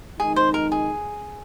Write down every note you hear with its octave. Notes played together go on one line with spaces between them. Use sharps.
F2 D#3 G#3 D#4 G#4
C5
A#4
G#4